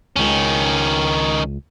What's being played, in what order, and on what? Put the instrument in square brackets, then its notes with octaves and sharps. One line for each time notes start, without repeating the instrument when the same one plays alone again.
[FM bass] C#2 [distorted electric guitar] D#3 C#4